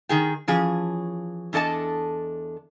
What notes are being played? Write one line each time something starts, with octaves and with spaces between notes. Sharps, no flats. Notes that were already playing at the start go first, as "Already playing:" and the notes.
D#3 G#4 G5
E3 F3 C#4 G#4
E2 D4 A4 D#5 A5